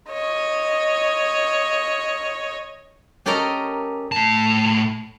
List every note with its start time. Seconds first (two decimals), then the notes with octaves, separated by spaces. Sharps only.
0.12 C#5 D#5
3.26 C#4 G4 A4 A#4 D#5 A#5
4.12 A2 A5